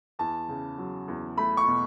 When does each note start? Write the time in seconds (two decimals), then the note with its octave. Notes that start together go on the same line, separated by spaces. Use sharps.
0.19 E2 A5
0.48 C#3
0.78 F#3
1.08 E2
1.37 A3 B5
1.57 C#6
1.67 B2